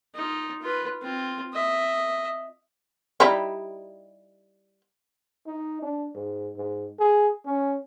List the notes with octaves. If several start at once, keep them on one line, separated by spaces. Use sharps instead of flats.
D#4 F4
F4 B4
C4 F4
D#5 E5
G3 D#4 E4
D#4
D4
G#2
G#2
G#4
C#4